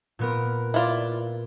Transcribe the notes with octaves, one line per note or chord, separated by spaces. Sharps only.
A#2 B3 A#4
E4 F4 D5